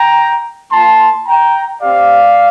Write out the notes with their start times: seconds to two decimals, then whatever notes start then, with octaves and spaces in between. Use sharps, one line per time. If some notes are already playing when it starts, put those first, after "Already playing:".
Already playing: G5 A#5
0.71 A#3 F4 A5 C6
1.26 G5 A#5
1.81 C4 G4 D5 F5